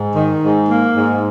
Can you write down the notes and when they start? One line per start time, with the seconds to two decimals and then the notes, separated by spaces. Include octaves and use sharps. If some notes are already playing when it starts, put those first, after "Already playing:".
Already playing: G#2
0.16 D#3
0.43 G#2
0.69 A#3
0.96 G#2